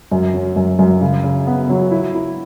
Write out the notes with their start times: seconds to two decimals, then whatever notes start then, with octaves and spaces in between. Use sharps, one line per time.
0.11 F#2
0.33 F#3
0.56 F#2
0.79 F#2
1.01 C#3
1.24 C#3
1.47 B3
1.69 F#3
1.91 E4
2.14 E4